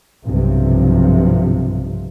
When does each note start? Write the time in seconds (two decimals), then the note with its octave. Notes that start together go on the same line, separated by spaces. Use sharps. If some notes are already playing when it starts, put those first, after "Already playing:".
0.24 B1 G2 C3 F3